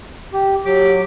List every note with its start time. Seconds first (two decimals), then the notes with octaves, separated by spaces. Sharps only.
0.33 G4
0.65 F#3 G4 D6